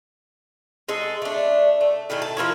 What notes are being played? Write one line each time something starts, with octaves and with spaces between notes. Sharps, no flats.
G#3 D#4 A4
A3 D4
A3
A2 D#3 A3 G#4
A5
F3 A#3 E4 C#5